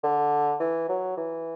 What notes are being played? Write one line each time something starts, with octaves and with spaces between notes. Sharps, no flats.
D3
E3
F#3
E3